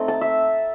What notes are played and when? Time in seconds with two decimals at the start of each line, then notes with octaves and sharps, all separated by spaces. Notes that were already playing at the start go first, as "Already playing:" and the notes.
Already playing: A3 C4 D#4
0.08 A5
0.21 E5